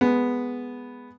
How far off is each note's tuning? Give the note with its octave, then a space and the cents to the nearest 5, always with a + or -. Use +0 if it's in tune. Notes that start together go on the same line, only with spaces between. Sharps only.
G#3 +0 B3 +0